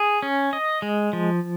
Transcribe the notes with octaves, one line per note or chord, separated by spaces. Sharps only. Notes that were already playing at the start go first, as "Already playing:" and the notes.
Already playing: G#4
C#4
D#5
G#3
F3